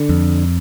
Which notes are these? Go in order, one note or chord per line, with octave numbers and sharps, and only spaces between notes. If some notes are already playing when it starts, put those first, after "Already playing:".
Already playing: D3
F2